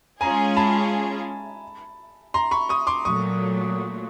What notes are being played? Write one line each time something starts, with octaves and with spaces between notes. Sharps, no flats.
G#3 C#4 F4 G#4 G#5 A#5
A5 B5
A#5 C6
B5 C#6
C#6 D#6
C6 D6
A#2 F#3 A3 C#6 D#6